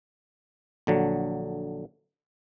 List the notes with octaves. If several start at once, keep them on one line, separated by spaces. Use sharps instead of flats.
A#1 D3 F#3